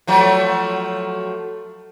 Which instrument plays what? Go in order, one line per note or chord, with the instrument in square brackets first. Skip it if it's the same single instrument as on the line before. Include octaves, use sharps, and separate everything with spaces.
[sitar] F3 F#3 A3